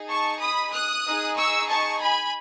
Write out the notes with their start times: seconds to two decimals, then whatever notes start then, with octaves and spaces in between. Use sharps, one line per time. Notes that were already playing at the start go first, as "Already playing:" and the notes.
Already playing: D#4 G#4
0.09 A5 C#6
0.40 B5 D#6
0.72 D#6 F#6
1.05 D#4 G#4
1.36 C#6 E6
1.69 A5 C#6
2.00 G#5 B5